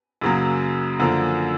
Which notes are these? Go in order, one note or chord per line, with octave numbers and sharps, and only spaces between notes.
F#2 C#3 F#3 A#3
F#2 D3 F3 A#3